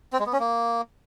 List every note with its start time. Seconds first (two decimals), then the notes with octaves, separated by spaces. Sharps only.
0.13 C4
0.19 G#3
0.26 B3
0.33 C#4
0.40 A#3